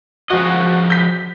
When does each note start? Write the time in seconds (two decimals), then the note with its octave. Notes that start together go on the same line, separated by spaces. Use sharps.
0.30 F3 G#3 F#4 D#5
0.90 G6 B6